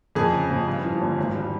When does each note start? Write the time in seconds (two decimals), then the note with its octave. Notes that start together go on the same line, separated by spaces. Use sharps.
0.15 F2 G#4
0.33 C#3
0.50 F2
0.67 G2
0.84 F3
1.01 G1
1.18 G#1
1.35 G3